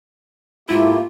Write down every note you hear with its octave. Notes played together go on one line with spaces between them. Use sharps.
G#2 A3 A#3 E4 F4 G4